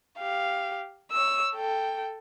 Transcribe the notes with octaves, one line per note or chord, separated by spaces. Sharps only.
G4 F5
C#5 E6
A4 G5